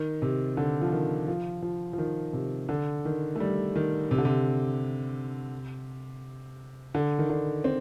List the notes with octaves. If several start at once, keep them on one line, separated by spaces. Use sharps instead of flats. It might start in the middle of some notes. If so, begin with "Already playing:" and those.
Already playing: D#3
C3
D3
F3
D#3
F3
F3
F3
D#3
C3
D3
D#3
A3
G3
D#3
C3
D3
C3
D3
D#3
D3
C4